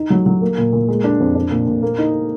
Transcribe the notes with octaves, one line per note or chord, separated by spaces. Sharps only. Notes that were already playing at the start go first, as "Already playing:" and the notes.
Already playing: D#4
F#3
F#3
A#3
A#2
A#2
G#3
D4
F2
D4
A#2
A#2
A#3
D#4